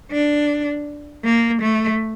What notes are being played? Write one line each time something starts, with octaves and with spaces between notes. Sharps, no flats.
D4
A#3
A3